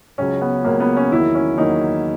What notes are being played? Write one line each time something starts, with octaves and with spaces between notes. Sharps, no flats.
C#2 C#3 F#3 C#4
B3
C#2 C#3 F#3 A#3
B3
C#4
E2 D#3 F#3 A#3 E4
C#4
E2 D#3 F#3 A#3 D#4